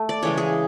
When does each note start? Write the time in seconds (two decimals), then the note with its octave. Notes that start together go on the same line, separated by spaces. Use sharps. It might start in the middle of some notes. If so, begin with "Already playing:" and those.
Already playing: A3
0.09 D5
0.23 C#3 E3 G#3 C#5
0.37 G#4